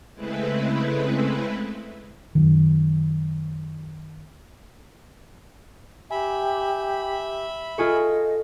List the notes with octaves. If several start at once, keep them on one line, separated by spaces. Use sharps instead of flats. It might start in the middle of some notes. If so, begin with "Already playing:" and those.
C#3 G#3 A3 C4 E4 B4
F#2 D#3
G4 E5 G#5 B5
F4 G#4 A4 D#5 C#6